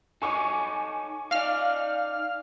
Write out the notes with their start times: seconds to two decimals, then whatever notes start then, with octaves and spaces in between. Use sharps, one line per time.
0.22 D#4 A4 C#5 G#5 C#6 D6
1.31 D#4 D5 F5 F6